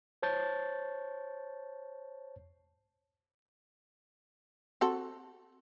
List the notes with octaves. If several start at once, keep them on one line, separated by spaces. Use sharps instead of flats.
C5 C#5 A5 G6 A6
C4 F#4 A4